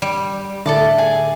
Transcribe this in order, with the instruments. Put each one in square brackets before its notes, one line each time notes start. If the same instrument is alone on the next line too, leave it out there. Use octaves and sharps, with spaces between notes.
[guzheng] G3
[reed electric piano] A2 D3 [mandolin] A4 D5 A5 [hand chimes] E5
[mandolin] G#4